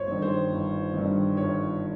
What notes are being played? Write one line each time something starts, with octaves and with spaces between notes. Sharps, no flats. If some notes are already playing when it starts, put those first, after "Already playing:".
Already playing: G1 C5 C#5
G2 D#3
C5
G1
G2 D#3
G1 C#5